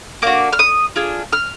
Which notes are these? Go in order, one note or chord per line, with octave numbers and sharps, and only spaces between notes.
A#3 D4 F#4 D6
F6
D#6
D4 F4 G#4
F6